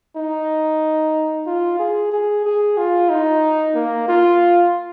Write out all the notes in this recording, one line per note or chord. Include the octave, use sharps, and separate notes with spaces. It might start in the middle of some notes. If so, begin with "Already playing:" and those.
D#4
F4
G#4
G#4
G#4
F4
D#4
A#3
F4